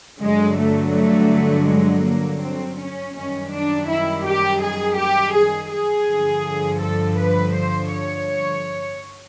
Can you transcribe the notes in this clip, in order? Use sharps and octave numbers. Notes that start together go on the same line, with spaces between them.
G2 D3 F#3 G#3
A3
A3
G#3
A#3
C4
C#4
F#2 D#3 G3 C#4
D4
E4
G4
G#4
G4
G#4
G#4
G2 D3 F3
A4
B4
C5
C#5